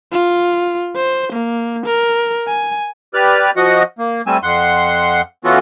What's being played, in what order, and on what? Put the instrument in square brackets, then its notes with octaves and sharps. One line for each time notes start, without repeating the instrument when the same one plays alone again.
[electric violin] F4
C5
A#3
A#4
G#5
[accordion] G4 B4 D5 F6
F3 F#4 D#5 F#5
A#3
G3 A3 C4 G#5 E6
F2 F#5 C6
E3 B3 C#4 F4 F#4 A4